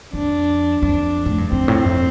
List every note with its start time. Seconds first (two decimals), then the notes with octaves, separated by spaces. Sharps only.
0.13 F2 D4
0.82 F2 D4
1.26 A2
1.38 G2
1.51 F2 C4
1.68 A2
1.85 F2